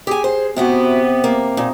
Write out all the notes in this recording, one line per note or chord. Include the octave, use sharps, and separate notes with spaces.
G4 G#4 G#5
C5
A2 C3 B3 E4 F#4 G4
A#3
A#2 D#4